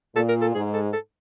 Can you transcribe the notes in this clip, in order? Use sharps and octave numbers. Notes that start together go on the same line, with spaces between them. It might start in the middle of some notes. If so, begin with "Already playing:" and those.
A#2 A4
A#4
A4
G#2 G#4
A4
A4